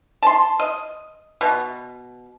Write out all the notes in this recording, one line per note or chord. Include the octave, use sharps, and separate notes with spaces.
A5 C6
D#5
B2